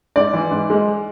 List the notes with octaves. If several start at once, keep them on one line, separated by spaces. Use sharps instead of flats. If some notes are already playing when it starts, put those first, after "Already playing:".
G#2 D5
E3
G#2
G#3